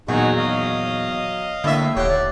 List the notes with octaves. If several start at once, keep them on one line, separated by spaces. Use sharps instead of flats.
E2 A#2 D#3 F#3 D#4 F#4 G#4
D#5 F5
A2 D3 A3 A#3 E5
D#1 G4 C#5 F#5 G5
D5